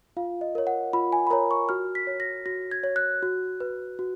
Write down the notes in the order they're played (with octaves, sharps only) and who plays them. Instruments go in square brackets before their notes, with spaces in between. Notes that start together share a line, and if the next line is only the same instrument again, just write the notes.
[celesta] F4 F5
D#5
A#4 C#5
F#5
F4 B5
G#5
B5
A#4 C#5 A#5
C#6
F#4 F6
B6
C#5
A#6
F#4 A#6
G#6
C#5
F#6
F#4
B4
F#4